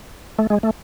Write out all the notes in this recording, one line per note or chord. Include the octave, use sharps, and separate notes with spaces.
A3
G#3
A3